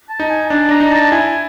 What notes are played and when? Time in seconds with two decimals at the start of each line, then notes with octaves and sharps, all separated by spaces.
0.09 A5
0.20 D#4
0.30 G#5
0.50 D4 A5
0.69 D4 A#5
0.80 D#4
0.91 A5
1.11 E4 G#5